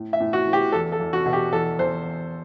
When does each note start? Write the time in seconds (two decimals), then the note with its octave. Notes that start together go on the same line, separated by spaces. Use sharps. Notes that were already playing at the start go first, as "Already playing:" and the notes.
Already playing: A2
0.13 E5
0.20 A2
0.33 F#4
0.47 E3
0.53 G4
0.72 E2 A4
0.92 A4
1.00 E2
1.13 F#4
1.26 B2
1.33 G4
1.53 E2 A4
1.79 E2 C5